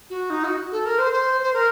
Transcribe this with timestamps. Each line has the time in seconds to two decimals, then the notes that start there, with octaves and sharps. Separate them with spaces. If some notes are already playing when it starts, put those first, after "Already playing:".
0.10 F#4
0.30 D#4
0.44 F#4
0.72 A4
0.86 A#4
0.99 C5
1.13 C5
1.42 C5
1.54 A#4